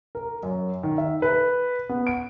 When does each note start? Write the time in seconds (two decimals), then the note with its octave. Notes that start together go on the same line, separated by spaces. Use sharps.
0.15 A#4
0.43 F#2
0.83 D#3
0.98 E5
1.22 B4
1.89 B3
2.07 D7